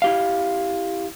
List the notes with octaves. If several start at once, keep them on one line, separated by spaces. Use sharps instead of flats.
E4 G4 F5